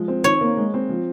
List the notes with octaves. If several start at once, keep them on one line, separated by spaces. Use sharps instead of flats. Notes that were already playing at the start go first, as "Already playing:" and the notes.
Already playing: F3 G#3
C4
D#3 C#5
A#3
G#3
C4
F3